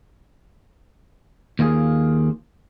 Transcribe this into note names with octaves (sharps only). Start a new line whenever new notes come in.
D#2 A#3 F4 G#4